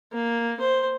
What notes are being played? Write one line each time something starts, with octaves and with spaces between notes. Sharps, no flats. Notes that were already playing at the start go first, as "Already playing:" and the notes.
A#3
C5